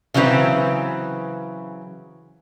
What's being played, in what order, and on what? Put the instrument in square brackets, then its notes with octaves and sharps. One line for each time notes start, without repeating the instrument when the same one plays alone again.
[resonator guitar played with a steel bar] C#3 E3 F#3 C4 B4